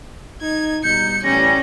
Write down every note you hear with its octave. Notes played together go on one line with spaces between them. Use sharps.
D#4 G#6
B2 G3 D#4 G6 C#7
A1 G3 C#4 A#6